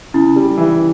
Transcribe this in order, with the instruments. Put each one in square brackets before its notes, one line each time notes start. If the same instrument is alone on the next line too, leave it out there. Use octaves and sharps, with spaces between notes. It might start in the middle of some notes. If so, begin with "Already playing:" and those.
[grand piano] C#3 [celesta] E4
[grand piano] G3
E3